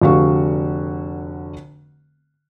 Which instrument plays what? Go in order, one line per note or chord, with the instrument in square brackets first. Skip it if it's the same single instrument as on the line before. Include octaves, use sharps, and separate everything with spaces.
[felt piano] F1 D3 F#4 F5 C#6